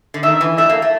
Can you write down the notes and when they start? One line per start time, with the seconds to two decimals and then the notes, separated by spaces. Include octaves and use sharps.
0.14 D3
0.23 D#3 E5
0.41 E3
0.58 A3 E5
0.69 A#3
0.82 A3